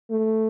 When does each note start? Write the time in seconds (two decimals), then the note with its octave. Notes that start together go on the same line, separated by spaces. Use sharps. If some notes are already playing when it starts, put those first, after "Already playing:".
0.11 A3